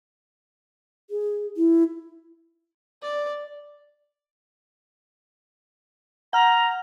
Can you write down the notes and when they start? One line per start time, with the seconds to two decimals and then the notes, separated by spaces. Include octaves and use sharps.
1.10 G#4
1.56 E4
3.02 D5
6.33 F#5 A#5 F6